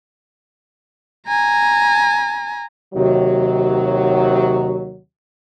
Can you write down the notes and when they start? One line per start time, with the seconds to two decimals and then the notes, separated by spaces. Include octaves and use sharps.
1.28 G#5 A#5
2.94 D#2 C3 D#3 F#3